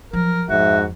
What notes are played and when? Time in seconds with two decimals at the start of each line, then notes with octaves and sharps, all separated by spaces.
0.13 F3 F#3 A#4
0.49 F2 G#2 F#4 E5